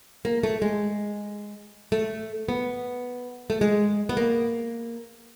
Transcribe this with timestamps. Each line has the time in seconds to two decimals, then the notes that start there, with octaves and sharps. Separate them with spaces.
0.25 A#3
0.43 A3
0.62 G#3
1.92 A3
2.49 B3
3.50 A3
3.61 G#3
4.09 B3
4.17 A#3